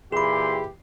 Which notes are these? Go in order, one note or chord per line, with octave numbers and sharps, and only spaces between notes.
A#2 E3 G4 G#4 B5 C6